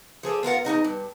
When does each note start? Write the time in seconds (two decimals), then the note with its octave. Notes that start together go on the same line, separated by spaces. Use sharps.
0.23 F3 G#4 A4 D5
0.43 B3 F4 A#4 F#5
0.65 E2 D#3 D#4 D#5
0.84 G2